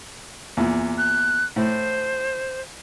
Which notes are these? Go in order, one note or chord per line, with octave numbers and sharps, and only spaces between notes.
E2 A#2
F#6
A2 C5